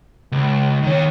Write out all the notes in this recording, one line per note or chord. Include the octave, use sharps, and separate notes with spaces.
C#2
D#3 C#5